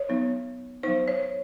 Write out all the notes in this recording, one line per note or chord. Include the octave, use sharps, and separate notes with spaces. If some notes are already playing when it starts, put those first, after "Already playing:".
Already playing: C#5
F#3 B3 D#4
F#3 B3 D#4 C5
C#5